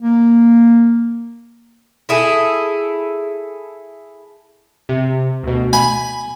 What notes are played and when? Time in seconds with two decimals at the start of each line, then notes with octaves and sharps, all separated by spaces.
0.01 A#3
2.09 E4 G#4 A4
4.89 C3
5.43 D2 B2
5.73 G#5 B5